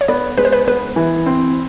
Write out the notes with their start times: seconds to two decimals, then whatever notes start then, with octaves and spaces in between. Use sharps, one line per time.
0.01 C#5
0.08 B3 D5
0.38 G#3 B4
0.45 C5
0.53 B4
0.68 B3 B4
0.96 E3
1.26 C4